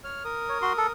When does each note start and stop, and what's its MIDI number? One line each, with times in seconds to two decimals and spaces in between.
0.04 0.23 73
0.04 0.23 89
0.25 0.92 70
0.25 0.92 87
0.49 0.58 73
0.62 0.73 66
0.62 0.73 84
0.77 0.87 69